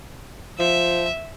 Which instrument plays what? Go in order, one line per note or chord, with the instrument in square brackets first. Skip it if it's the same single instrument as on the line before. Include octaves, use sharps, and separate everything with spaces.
[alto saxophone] F3 [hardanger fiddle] E5